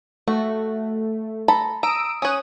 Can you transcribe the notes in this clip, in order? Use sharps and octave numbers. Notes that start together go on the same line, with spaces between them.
A3 F#4
A4 A#5 B5
A#5 D#6 E6 D7
C#4 C#5 D#6 F#6